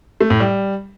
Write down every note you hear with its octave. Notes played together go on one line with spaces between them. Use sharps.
A3
A2
G3